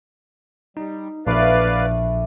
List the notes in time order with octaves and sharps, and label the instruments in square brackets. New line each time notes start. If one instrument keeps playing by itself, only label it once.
[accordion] G3 [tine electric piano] D#4
[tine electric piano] A#1 [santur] A3 E4 D6 [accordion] B4 D5 F5